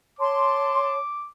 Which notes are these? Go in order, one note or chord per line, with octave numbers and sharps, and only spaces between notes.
C#5 A5 C6 D6